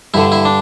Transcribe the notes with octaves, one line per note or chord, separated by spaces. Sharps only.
G2 D3 E4
E4
D4